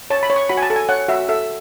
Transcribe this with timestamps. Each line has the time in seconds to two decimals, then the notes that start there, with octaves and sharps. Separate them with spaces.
0.10 C#5 A5
0.23 B5
0.30 C#5
0.36 C#6
0.49 F#4 B5
0.57 G#5
0.63 A5
0.70 A4
0.76 G#5
0.89 C#5 F#5
1.08 F#4 E5
1.29 A4 E5